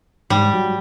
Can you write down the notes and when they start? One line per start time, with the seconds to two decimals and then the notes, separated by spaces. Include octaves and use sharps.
0.30 G#2 G3
0.54 F#3